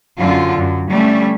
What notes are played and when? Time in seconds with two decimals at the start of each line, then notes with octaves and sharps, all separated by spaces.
0.18 F#2 D3 F4
0.58 F#2
0.89 G3 A3 C#4